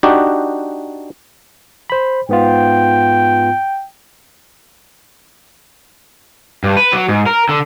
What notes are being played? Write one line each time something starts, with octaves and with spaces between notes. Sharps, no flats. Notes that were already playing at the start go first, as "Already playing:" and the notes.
D4 D#4 F#4 G4
C5 B5
G#2 B3 F4 G5
G2
B4
F#3
G#2
A#4
D3